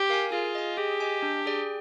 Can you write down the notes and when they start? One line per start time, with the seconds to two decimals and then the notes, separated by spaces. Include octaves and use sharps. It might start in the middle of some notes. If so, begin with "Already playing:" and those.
Already playing: G4
0.09 A#4 F5 G#5
0.32 F4 G#4
0.55 D#5 G#5
0.77 G4 G#4
1.00 D#5 G#5
1.23 D4
1.46 G#4 D5 G5